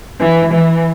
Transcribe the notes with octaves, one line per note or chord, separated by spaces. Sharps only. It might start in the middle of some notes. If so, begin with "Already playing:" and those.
E3
E3